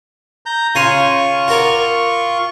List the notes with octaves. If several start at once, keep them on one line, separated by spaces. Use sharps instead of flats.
A#5 G6
C#3 F4 G#5 C6 C#6
F#4 A#4 D5